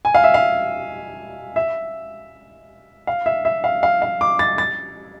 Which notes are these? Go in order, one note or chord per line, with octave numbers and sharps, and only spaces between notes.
G#5
F5
E5
F5
E5
F5
E5
E5
F5
F5
F5
D6
A6
A6